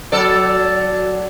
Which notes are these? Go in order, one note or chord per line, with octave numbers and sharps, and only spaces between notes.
F#3 A4 D5